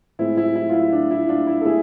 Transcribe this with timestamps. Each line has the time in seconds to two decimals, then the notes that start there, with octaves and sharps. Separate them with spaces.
0.19 A2 G#3 C4 E4
0.37 E4
0.55 E4
0.69 F4
0.73 E4
0.92 D4
1.11 E4
1.29 D4 F4
1.47 E4
1.61 A4
1.65 G#3 B3 E4 G#4